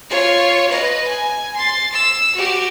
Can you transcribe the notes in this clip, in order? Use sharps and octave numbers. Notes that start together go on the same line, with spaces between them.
F4 C#5
B4 D#5
G#5
C6 A6
E6
F#4 G4